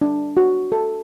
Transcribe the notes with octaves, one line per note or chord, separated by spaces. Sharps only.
D4
F#4
A4